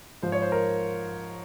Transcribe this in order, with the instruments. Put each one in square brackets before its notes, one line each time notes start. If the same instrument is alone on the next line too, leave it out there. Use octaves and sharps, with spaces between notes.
[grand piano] G#2 F3 C5
C#5
C5
A#4